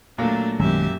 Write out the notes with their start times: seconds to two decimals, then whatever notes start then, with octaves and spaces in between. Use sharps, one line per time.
0.18 A#2 F#3 A3 A#3 D4
0.60 A#1 F#2 D#3 G#3 G4 E5